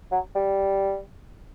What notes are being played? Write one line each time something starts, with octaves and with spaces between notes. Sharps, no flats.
F#3
G3